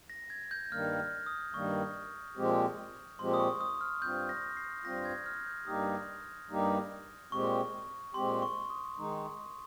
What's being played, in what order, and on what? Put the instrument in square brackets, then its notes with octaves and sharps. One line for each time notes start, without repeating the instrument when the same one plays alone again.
[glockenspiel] A#6
G#6
G6
[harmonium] G2 D#3 G3 A#3 [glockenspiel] F6
[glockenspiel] F6
D#6
[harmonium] G2 D#3 G3 A#3 [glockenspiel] C#6
[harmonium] A#2 F3 G#3 C4 G4
[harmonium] A#2 F3 G#3 C4 G4 [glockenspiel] C6
[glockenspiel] D#6
C#6
D#6
F6
[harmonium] G2 G3 C4 F4 [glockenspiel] G6
[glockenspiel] A#6
C7
[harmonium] G2 G3 C4 F4 [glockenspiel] A#6
[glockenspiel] G#6
F6
G6
[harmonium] G2 G3 A#3 D#4 G4 [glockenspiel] D#6
[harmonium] G2 G3 A#3 D#4 G4
[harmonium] A#2 G#3 C4 G4 [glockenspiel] C#6
[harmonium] A#2 G#3 C4 G4 [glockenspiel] C6
[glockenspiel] C#6
D#6
[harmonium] D#3 G#3 D#4